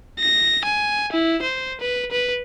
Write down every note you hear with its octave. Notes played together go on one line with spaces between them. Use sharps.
A#6
G#5
E4
C5
B4
B4